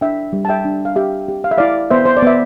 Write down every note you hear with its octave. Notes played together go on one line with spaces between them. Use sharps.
D4 E5 G5
G3
A5
E5 G5
D4
F5
G4 E5 G5
G4
F5
E5
E4 D5 F5
B3 C5 E5
C5
D5
B3 E5